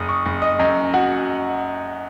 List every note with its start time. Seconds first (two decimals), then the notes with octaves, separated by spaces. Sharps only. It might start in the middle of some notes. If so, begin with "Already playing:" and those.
Already playing: F#1 D#6
0.09 C#6
0.26 F#1
0.42 D#5
0.59 F#2 D#5
0.94 F#4 F#5